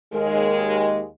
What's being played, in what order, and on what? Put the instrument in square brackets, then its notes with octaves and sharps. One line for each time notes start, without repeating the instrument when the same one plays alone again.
[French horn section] D#2 G#3 [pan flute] A#4